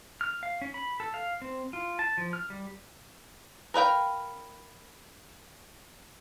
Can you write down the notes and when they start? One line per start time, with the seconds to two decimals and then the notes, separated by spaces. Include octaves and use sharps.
0.21 F6
0.43 F5
0.62 C#4
0.74 B5
1.00 A4
1.14 F5
1.42 C4
1.73 F4
1.99 A5
2.18 F3
2.33 F6
2.50 G3
3.74 A#4 B4 F5 G5